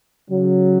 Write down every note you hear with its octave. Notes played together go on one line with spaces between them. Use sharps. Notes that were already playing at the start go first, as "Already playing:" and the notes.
C#3 F#3